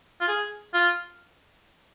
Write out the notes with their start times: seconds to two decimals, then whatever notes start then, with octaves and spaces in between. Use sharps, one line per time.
0.21 F4
0.28 G#4
0.74 F4